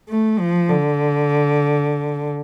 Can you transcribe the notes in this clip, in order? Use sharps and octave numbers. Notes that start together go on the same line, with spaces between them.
A3
F3
D3